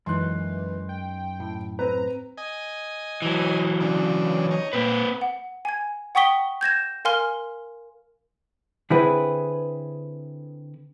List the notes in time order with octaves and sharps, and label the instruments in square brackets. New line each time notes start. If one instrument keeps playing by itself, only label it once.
[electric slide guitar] F#2 D#4 [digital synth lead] E3 [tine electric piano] G#3 F#6 [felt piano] C6
[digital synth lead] G5
[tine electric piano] A2
[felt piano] C4 B4 [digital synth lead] A#5
[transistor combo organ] D#5 G#5
[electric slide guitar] E3 F#3
[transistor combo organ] C#3 D4
D#4 C#5
[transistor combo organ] A#2 [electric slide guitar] A#3 C4 B4
[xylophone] F#5
G#5 G#6
F#5 G5 C#6 D#6 B6 G7
G6 G#6 A#6 E7
A#4 F5 G#5 C6 F6 G7
[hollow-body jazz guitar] D3 C4 E4 G#4 B4